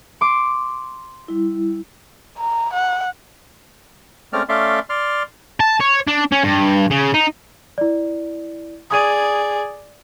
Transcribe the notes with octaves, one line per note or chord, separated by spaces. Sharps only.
C6 D6
G3 E4
A#5
F#5
G#3 A3 C4 C#4 D5 F6
A3 C#4 D5 E5 F5 C6
D5 C6 F6
A5
C#5
D4
C#4
G2
C#3
D#4
E4 D5
G#4 D5 D#6 G#6 D#7